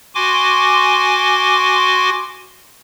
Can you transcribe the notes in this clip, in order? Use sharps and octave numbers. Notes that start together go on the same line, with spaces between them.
F#4 G#5 C6 D6